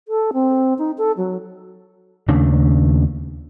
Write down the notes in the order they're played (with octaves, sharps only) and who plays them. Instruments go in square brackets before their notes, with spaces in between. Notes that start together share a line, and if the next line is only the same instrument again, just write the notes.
[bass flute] A4
C4
D#4
A4
F#3
[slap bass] D#2 C#3 A3 D4